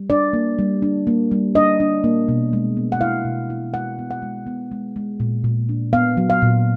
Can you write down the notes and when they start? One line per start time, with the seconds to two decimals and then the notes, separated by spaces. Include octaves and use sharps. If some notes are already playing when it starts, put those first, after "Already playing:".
Already playing: G3
0.10 D4 D5
0.33 A#3
0.59 G3
0.82 D4
1.07 A#3
1.31 G3
1.55 D4 D#5
1.80 D4
2.04 A#3
2.28 B2
2.53 G#3
2.77 B3
2.92 F#5
3.01 E4 F5
3.25 B2
3.50 E4
3.74 G#3 F#5
3.99 B3
4.11 F#5
4.22 G#3
4.47 B3
4.71 G#3
4.96 G#3
5.20 A#2
5.44 A#2
5.69 D4
5.93 B3 F5
6.17 F#3
6.30 F5
6.42 A#2